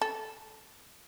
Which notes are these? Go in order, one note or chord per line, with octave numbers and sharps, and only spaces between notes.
A4